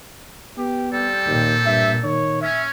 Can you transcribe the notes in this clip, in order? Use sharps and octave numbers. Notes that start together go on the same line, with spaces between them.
B3 G4
G3 C4 G4 A4
D#2 A#2
G2 E5
D#3 C#5
C#4 E5